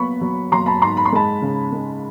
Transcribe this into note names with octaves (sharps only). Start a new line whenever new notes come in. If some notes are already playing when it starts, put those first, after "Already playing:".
Already playing: F#3 B3 B5 C#6
F#3
F#3 A#5 C6
A5 B5
G#2 A#5 C6
B5
C6
G#3 A5 B5
C#3
G#3